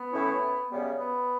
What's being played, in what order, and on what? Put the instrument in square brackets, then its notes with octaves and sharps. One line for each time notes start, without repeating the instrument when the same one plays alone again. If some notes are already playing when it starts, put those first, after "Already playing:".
Already playing: [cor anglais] B3
[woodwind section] A2 E3 A3 C#4 E4
F#2 C#3 G3 B3
[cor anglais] B3